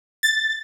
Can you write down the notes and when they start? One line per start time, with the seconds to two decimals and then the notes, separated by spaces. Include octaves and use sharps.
0.23 A6